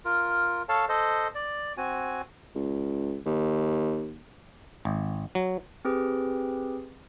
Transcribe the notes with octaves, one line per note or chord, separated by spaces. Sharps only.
F4 A#4
A4 C#5 F5 A5
A4 C5 D#5
D5
C4 F#4 G#5
C#2
D#2
G#1
F#3
C4 G4 G#4 B4